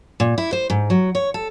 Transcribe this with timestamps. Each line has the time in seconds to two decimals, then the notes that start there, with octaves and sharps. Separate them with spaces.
0.20 A#2
0.38 E4
0.53 C5
0.70 G#2
0.90 F#3
1.15 C#5
1.34 A4